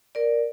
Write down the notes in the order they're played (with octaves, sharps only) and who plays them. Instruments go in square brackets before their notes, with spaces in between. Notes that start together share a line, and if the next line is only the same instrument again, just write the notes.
[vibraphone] A#4 D5